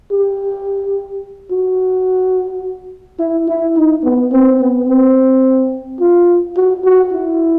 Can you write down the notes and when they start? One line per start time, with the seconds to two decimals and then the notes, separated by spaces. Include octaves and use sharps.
0.11 G4
1.51 F#4
3.19 E4
3.48 E4
3.76 D#4
4.03 B3
4.32 C4
4.60 B3
4.87 C4
6.00 F4
6.56 F#4
6.84 F#4
7.12 E4